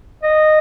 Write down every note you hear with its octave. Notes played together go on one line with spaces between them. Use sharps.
D#5